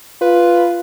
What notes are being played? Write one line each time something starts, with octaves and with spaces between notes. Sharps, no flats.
F4 B4